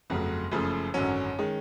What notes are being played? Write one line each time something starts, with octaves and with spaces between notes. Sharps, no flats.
G1 F2 C#3 F#3 A3
F#1 F#2 C#3 F3 A3
G#1 F#2 D3 F#3 C#4
D#3 G#3